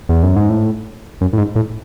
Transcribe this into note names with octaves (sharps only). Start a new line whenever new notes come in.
E2
F#2
G#2
A2
F#2
A2
G#2
A2